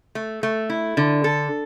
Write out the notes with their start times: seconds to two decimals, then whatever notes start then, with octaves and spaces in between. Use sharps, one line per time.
0.15 A3
0.43 A3
0.70 E4
0.97 D3
1.24 A4